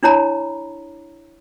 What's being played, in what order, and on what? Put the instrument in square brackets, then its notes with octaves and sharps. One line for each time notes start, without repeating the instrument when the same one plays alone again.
[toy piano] D4 E4 C#5 A#5 B5